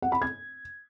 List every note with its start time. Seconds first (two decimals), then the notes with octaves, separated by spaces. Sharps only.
0.02 F#5
0.12 B5
0.22 G#6